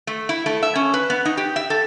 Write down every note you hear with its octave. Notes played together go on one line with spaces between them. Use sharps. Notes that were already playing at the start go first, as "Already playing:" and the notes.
A3
E4
A3
E5
C#4
B4
B3
D#4
G4
E5
A4